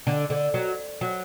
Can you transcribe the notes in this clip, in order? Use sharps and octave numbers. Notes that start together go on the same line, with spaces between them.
D3
D3
F#3
F#3